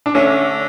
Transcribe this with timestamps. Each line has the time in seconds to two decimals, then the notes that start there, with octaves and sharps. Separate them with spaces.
0.06 D4
0.15 D3 A3 C#4